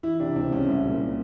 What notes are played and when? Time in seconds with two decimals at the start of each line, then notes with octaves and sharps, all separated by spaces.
0.03 E3 E4
0.20 C3 D4
0.36 C#2 C4
0.52 C#2 C#4
0.69 C2
0.85 A#2